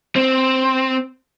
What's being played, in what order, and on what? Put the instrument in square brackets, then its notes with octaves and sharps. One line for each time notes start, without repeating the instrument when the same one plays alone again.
[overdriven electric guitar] C4